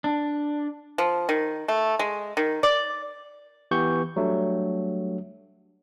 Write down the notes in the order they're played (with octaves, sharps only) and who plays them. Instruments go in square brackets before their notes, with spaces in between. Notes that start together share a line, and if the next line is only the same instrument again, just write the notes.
[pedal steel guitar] D4
[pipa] F3
D#3
A3
G#3
D#3
D5
[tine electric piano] E3 B3 G4 C#6 G6
F#3 G3 A3 D4